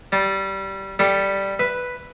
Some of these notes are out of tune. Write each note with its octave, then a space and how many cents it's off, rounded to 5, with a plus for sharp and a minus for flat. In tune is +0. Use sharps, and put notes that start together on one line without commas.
G3 -15 A5 +0
G3 +0 A4 +0 E5 +0
B4 +0 E5 +0